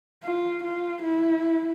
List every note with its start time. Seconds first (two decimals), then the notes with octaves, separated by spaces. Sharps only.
0.23 F4
0.64 F4
1.04 E4